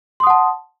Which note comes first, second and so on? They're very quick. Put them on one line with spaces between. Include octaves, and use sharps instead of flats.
C6 D#6 F#5 A5